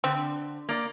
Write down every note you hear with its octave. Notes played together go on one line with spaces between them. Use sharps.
D3 C4
A#3 D5